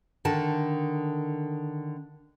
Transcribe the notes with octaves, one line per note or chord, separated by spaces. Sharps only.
D3 D#3 A5